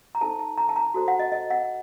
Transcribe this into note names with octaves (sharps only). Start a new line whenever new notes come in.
A#5
D#4 A4 C5 A5
A5
A#5
A5
A#5
F#4 A4 C5
F#5
D#5
D#5
F#5